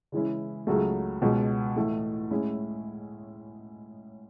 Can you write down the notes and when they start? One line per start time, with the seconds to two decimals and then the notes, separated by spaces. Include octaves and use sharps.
0.12 C#3 E3 G#3 C#4 E4
0.67 C#2 C#3 F#3 A3
1.22 C#2 B2 G#3
1.76 A2 E3 A3
2.31 A2 G#3 C#4 E4